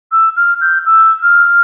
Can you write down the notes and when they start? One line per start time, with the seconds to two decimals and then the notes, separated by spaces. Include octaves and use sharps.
0.12 E6
0.37 F6
0.61 G6
0.86 E6
1.23 F6